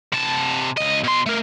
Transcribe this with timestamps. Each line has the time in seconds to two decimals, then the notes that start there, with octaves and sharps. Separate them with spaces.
0.13 C3 A5
0.77 C#2 D#5
1.04 B2 C6
1.26 A3 A#4